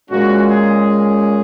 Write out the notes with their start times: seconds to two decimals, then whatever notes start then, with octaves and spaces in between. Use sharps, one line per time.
0.11 A#2 G#3 C#4 F#4
0.49 G#4